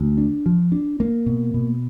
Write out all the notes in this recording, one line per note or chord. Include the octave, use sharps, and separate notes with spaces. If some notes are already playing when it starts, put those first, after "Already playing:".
Already playing: D2
D4
F3
D4
A#3
B2
B2